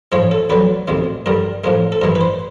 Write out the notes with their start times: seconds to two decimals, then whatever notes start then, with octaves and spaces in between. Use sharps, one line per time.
0.12 G#2 F3 G#3 C#5
0.31 A4
0.50 D2 D3 F#3 B4
0.88 D2 C3 D#3 G#3
1.26 G2 D3 G3 A#4
1.64 A2 F3 G#3 A#4
1.92 A4
2.01 G2 E3 G#3 A#4
2.15 B4
2.21 C5